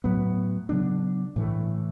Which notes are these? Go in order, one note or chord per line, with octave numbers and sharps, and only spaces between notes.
A2 F#3 B3
C#3 F#3 B3 D4
A2 E3 A3